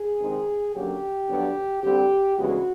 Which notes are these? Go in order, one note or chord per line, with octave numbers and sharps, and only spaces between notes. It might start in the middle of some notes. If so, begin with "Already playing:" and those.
Already playing: G#4
C3 D#3 G#3 C4 D#4
F#2 D3 F#3 A#3 C#4 G4
G2 D3 F#3 B3 D4
D2 D3 G3 C4 G4
D2 C#3 E3 G#3 B3 F#4